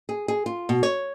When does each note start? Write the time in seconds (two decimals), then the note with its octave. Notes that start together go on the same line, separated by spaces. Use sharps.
0.09 G#4
0.28 G#4
0.46 F4
0.69 B2
0.83 C#5